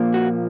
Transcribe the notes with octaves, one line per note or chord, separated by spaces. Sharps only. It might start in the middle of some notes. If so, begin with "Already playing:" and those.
Already playing: A#2 F3 A#3
F#4